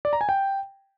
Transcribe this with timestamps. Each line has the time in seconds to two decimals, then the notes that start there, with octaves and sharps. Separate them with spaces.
0.05 D5
0.13 A#5
0.21 G#5
0.29 G5